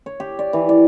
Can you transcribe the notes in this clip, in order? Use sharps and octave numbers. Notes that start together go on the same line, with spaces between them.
C#5
G4
D5
E3
D5